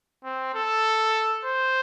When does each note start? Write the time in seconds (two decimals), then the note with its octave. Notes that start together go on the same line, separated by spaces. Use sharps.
0.24 C4
0.54 A4
1.44 C5